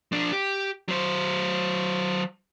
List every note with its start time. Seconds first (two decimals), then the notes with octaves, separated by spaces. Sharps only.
0.12 F3 D4
0.32 G4
0.89 F#3 C5